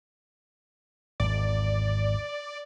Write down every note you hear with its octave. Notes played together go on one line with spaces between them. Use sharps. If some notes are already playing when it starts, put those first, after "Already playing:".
G#1 E2 D5